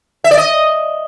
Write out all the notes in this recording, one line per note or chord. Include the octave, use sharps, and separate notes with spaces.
E5
D5
D#5